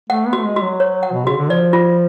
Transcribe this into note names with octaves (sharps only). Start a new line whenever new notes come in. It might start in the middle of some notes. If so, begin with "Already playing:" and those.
A3 F#5
B3
A3 F#4
G#3
F#4
F#3
C#5
F#5
B2
C#3 F#4
D3
F3 D5
F4